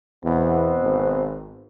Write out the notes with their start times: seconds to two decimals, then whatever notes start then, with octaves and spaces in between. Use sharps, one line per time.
0.24 E2 B2 B3 C4
0.83 G#1